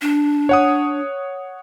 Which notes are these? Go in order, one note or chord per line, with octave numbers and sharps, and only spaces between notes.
D4
C#5 F#5 D#6